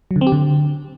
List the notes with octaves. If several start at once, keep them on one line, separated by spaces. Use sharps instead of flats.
F#3
D3
C4
G4
D3